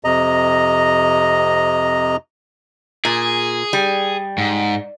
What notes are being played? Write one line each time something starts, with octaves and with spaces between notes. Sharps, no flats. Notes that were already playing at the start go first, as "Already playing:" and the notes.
F2 C3 D#5 A#5
A#2 G#4
G3
G#2